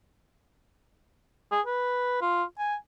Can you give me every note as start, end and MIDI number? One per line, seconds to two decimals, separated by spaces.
1.52 1.61 68
1.66 2.21 71
2.21 2.43 65
2.58 2.75 80